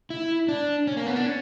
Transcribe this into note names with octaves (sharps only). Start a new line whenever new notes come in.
E4
D4
C#4
A#3
B3
D4
C#4